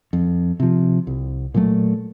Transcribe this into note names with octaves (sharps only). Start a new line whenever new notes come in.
F2
C3 F3
C2
A#2 F#3 A3